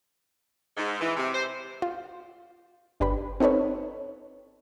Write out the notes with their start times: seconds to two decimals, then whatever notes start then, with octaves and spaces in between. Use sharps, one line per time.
0.77 G#2
1.01 E3
1.17 C3
1.33 C5
1.82 F4
3.00 G1 D4 G4 B4 B5
3.40 C4 D#4 A4 B4 C#5